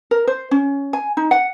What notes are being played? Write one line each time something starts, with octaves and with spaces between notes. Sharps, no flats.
A#4
C5
C#4
G#5
D#4
F#5